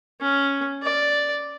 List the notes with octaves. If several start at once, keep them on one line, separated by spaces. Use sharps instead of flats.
C#4
D5